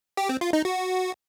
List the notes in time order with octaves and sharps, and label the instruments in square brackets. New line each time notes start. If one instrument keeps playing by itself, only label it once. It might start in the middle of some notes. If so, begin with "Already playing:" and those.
[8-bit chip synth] G4
C4
F4
D#4
F#4